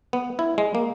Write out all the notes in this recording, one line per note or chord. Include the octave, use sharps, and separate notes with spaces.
B3
E4
G#3
A#3